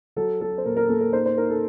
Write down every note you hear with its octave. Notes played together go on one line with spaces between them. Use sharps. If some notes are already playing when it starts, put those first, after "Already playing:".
F#3 A4
F#3 A4
C5
A#2 A#4
A#4
A#3 A4
A#4
D#4 C5
C5
D#4 A#4
A4